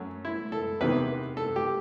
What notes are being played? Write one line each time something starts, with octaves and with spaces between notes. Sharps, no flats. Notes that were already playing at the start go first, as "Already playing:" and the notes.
Already playing: F#2 F#3 A3
E4
A4
E2 C3 D#3 B4
A4
G4